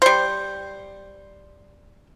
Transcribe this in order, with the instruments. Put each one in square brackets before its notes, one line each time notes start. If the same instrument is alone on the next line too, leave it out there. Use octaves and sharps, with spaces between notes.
[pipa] G3 C5